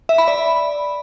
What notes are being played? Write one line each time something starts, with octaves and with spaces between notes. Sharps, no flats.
E5
B5
D5